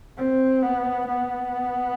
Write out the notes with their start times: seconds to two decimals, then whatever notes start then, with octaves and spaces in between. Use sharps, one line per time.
0.18 C4
0.62 B3
1.08 B3